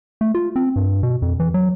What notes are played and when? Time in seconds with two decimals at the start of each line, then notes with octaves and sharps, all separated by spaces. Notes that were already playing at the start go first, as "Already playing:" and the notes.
0.21 A3
0.35 F4
0.56 C4
0.76 G2
1.03 B2
1.22 F2
1.40 E3
1.54 F#3